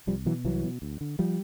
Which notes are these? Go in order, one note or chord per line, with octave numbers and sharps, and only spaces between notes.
C2 F3 G3
B2 E3 F#3
C2 E3 F#3
B2
D2
D3
F3 G3